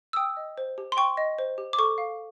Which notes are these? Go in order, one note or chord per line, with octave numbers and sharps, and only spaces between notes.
E6
G5 D#6
D#5
C5
G4
C6
G5 C#6
D#5
C5
G4
D6
A4 C#6
F5